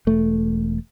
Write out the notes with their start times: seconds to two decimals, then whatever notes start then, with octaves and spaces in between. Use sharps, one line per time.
0.07 E1 A3